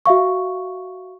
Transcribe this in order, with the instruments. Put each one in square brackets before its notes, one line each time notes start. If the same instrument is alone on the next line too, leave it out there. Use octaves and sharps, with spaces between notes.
[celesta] F#4 E5 F5 C#6